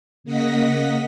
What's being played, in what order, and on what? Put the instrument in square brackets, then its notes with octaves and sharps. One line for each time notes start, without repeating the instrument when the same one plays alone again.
[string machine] C#3 A#3 D#5 F#5 A#6 B6